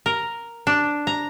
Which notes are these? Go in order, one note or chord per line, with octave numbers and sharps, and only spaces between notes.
A#4
D4
A#5